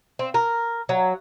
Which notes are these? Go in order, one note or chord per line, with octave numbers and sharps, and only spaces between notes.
C4
A#4
F#3